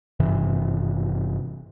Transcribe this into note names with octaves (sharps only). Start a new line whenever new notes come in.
G#1 G2 C3 E3